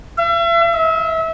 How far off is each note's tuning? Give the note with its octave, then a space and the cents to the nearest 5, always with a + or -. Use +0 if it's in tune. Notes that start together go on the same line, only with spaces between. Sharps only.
E5 +40
E5 -30